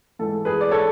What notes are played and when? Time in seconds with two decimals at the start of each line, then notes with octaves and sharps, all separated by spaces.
0.19 G#2 E3 A4
0.45 G#4 B4
0.61 D5
0.71 A4 C#5